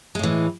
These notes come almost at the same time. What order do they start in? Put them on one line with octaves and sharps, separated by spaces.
G#3 A2 E3